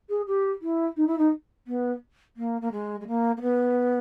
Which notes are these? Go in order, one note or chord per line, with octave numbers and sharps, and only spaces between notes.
G#4
G4
E4
D#4
E4
D#4
B3
A#3
A#3
G#3
G#3
A#3
A#3
B3